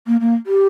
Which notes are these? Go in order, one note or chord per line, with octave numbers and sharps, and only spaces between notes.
A#3
A#3
G4